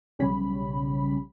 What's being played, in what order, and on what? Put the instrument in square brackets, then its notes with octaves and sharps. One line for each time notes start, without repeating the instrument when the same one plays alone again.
[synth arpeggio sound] B1 C#3 F3 G3 C#4 B5